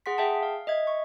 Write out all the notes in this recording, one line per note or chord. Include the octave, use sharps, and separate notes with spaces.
G#4 F#5 C6 B6
G#4 E5 G5 A5
F5
D#5 E5 G#6
C#6